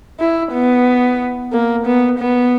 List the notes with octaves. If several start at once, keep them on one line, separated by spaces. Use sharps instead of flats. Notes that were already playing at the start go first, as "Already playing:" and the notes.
E4
B3
A#3
B3
B3